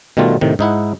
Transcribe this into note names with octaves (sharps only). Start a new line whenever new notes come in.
B2 D#3 G3 A3 F4
A2 C3 D#3
G#2 D#4 E4 F#5